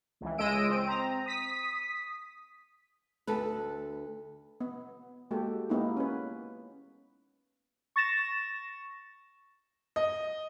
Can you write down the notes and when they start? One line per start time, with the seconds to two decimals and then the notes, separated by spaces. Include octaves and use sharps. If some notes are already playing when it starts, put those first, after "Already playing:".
0.21 C#2 E3
0.38 C#2 G#3 D#5 E6 D7 D#7
0.70 C4
0.85 C4 A#5
1.26 D#6 B6
3.27 D2 A4 B4
4.61 B3
5.31 G#3 A#3 F#4 G4 A4
5.70 G#3 A#3 B3 D#4 E4 G4
5.97 C#4 B4
7.96 C#6 A6 A#6 E7
9.96 D#5